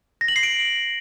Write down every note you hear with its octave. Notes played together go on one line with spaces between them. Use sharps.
A#6
F#7
C7
D7